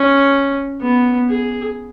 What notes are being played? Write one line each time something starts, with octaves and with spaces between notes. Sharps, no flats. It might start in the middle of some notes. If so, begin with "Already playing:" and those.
Already playing: C#4
B3
G#4